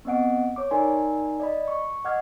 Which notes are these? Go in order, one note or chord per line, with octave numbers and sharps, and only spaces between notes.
B3 C4 D#5 F#5 D7
C#5 D6
D#4 A#4 D5 G#5 C6
D5 D#5 B5
C#6
D#5 F#5 D6 F6 G#6